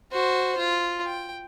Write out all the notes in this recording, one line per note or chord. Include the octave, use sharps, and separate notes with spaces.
F#4 C5
F4
G5